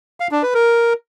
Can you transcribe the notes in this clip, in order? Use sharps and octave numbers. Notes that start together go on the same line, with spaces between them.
F5
D4
B4
A#4